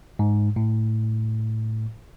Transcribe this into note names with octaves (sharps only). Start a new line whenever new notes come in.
G#2
A2